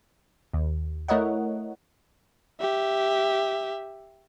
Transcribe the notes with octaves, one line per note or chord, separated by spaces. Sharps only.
D#2
A3 E4 A#4 C#5 D#5 F#5
G4 E5